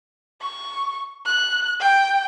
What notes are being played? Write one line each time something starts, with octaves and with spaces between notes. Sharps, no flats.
C#6
F#6
G5